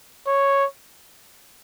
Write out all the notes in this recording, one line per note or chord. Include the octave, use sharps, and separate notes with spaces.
C#5